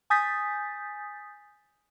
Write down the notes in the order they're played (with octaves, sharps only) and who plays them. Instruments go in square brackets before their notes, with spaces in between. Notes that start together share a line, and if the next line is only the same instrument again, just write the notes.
[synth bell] G#5 D#6 G6 A6 B6